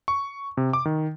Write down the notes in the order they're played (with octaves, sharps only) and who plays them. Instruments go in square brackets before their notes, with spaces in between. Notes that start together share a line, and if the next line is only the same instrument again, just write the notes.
[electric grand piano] C#6
C3
D6
D#3